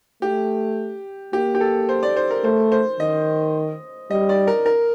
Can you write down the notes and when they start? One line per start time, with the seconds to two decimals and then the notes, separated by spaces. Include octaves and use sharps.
0.22 A3 G4
1.33 A#3 G4
1.55 G4
1.61 A4
1.89 C5
2.03 D5
2.16 C5
2.30 A#4
2.44 A3 C5
2.72 C5
3.00 D#3 D#5
4.11 G3 D#5
4.29 D5
4.47 A#4
4.66 A#4